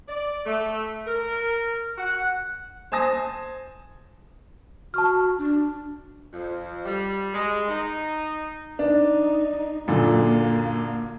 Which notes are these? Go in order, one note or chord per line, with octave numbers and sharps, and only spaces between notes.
D5
A3
A#4
F#5
C5 G#5 A5 D#6 A#6
F#4 A5 C#6 F6
D4
F2
G3
G#3
D#4
D4 D#4
F#2 A#2 D3 A#3